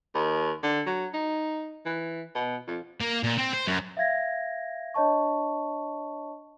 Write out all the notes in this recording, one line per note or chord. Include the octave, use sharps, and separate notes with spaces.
D#2
D3
F#3
D#4
E3
B2
F2
A#3
A#2
C4
C5
F#2
E5 F5 G#6 A#6
D4 C#5 D#5 A5 C#6